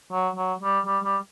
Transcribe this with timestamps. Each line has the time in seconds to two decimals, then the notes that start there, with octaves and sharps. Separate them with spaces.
0.12 F#3
0.36 F#3
0.62 G3
0.86 G3
1.04 G3